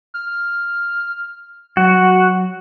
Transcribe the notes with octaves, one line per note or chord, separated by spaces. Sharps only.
F6
F#3 F#4